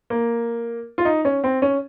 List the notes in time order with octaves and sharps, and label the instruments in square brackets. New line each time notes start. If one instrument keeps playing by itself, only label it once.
[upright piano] A#3
F4
D#4
C#4
C4
C#4